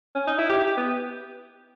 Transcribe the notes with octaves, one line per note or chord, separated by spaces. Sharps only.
C#4
D#4
E4
G4
G4
B3